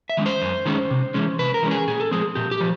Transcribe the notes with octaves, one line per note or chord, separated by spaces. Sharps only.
E5
D#3 G#3 C#4
C5
F#2
D#3 G#3 C#4
C3
E3 G#3 C#4
C3 B4
A#4
E3 G#3 C#4
G#4
A#2 G#4
A4
F3 G#3 C4 G#4
A#2 G4
G4
F3